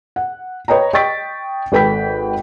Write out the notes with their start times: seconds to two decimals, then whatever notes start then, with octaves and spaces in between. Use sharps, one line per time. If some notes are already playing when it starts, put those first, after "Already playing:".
0.16 F#5
0.68 B4 C#5 D#5 G5 A#5
0.93 D#5 G5 C#6 A6 B6 D7
1.72 G#1 A4 B4 G5 B5 B6